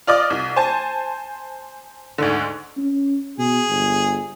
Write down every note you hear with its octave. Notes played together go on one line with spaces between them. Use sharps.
F4 D5 D#5 D6
C2
C5 G#5 A5
D2 G#2 D3
C#4
B2 G#4
G1